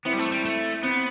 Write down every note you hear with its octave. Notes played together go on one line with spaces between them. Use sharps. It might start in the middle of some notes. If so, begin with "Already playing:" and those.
B3 C4 E4
G3
A3
G3
A3
B3 C4